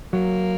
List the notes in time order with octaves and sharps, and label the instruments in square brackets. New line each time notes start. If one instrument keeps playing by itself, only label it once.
[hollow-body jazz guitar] F#3 [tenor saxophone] A#3